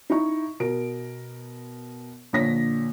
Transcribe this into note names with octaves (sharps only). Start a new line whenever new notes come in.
D#4 E4 C#6
B2 A#4 D7
A#1 D3 C#5 A#6 B6